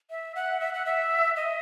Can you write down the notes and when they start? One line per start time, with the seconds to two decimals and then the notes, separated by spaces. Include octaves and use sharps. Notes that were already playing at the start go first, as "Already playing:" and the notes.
0.10 E5
0.35 F#5
0.60 E5
0.74 F#5
0.86 E5
1.36 D#5